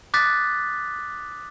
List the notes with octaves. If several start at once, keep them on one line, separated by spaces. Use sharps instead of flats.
D6 D#6 F#6 A6 B6